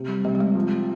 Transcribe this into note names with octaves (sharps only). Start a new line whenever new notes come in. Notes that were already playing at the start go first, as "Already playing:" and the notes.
Already playing: C3
G3
C3 G3
G3
G#3
F3